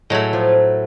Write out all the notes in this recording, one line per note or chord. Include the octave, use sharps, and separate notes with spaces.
A2 F#3 G#3 A3
F3